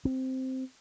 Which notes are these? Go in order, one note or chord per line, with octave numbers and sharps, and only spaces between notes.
C4